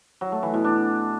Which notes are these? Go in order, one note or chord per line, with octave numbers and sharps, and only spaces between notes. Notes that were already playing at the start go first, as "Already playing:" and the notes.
F#3
A3
E3
B2
D4